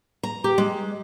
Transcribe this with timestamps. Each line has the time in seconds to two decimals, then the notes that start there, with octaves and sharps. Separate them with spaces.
0.23 A#5
0.44 G4
0.58 G#3